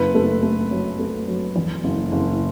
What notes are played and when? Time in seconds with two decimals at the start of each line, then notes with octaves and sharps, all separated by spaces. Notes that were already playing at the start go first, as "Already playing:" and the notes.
Already playing: F#1 B4
0.15 A3
0.43 A3
0.71 F#3
0.99 A3
1.28 F#3
1.56 E2
1.83 F#1
2.12 F#1